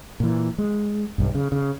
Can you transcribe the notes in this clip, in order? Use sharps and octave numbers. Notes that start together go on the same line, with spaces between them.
A#2 E3
G#3
B1 G2
C#3
C#3